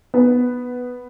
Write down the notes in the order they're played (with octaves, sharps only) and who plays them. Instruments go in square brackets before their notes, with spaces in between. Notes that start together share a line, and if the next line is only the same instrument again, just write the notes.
[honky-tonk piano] B3